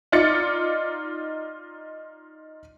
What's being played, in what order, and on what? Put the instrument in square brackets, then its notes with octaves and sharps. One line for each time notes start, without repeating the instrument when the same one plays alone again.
[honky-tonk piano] D#4 F4 D5 A6 C#7